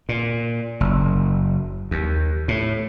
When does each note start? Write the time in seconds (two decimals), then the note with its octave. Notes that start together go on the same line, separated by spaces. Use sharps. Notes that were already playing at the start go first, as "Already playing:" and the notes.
0.09 A#2
0.80 F#1
1.91 D#2
2.48 A2